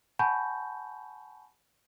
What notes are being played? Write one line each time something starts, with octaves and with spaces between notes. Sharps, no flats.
F#5 G#5 A5 B5 C#6 G6